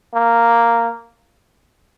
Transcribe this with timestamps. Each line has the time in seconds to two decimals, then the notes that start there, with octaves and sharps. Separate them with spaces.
0.14 A#3